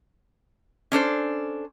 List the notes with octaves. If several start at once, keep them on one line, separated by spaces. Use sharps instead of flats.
C#4 D4 A4 C5